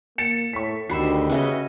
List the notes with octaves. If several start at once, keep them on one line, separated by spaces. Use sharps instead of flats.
A#3 A6 C#7 E7
A2 C#6 B6
D2 D#3 F#4 G4 E5 B5 C7
C#3 C#4 F#4 B4 D#5 E5